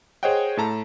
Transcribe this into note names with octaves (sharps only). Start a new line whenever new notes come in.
G#4 C5 C#5 D#5 F#5 G5
A2 A4 A5 A#5